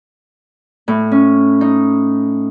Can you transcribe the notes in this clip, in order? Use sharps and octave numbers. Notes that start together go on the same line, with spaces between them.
A2
C#4
D#4